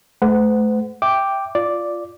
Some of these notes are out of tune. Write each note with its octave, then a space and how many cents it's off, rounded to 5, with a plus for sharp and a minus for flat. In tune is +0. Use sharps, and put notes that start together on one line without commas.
A3 -30 C5 -45 F#5 +0
E5 +0 G5 +0 D6 +0
F4 -5 D5 +0